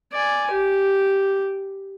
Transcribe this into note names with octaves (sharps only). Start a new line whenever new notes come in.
D5 G#5
G4